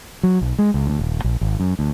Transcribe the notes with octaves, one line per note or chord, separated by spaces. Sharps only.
F#3
B1
G#3
C#2
D2
D#1
A#1
G#1
F#2
D2